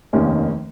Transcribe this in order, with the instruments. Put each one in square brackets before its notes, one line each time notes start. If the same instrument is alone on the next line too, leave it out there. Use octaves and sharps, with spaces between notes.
[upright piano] F1 D#2 D#3 A#3 C#4